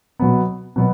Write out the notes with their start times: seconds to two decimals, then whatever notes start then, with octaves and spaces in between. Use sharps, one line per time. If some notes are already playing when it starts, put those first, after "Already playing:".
0.19 B2 F#3 B3
0.76 B2 F#3 B3